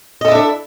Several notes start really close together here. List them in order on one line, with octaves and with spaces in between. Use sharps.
D#5 A4 E4 D4 E5